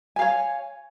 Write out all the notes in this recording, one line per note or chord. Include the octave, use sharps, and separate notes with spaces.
C#5 F5 G#5